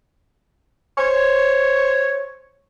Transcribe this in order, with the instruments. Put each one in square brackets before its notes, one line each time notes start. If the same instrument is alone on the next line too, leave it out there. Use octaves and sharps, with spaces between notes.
[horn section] C5 C#5